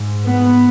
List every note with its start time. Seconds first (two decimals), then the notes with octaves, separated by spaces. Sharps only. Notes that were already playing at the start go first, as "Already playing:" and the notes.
Already playing: G#2
0.27 B3